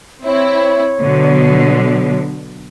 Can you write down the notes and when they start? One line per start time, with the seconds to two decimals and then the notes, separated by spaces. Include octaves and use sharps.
0.25 C4 E4 C#5
0.99 B2 D3 F#3